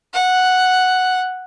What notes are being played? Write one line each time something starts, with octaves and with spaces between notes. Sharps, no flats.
F#5